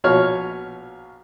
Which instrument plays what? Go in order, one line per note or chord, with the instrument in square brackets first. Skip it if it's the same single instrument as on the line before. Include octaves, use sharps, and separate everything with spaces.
[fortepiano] A#1 B2 C#5 F6